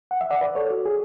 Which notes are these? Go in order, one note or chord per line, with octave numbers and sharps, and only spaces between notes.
F#5
E5
D5 F#5
B4 D5
A4 C#5
F#4
G#4